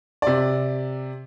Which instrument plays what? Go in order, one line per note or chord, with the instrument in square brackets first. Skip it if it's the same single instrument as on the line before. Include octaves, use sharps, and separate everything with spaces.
[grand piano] C3 D5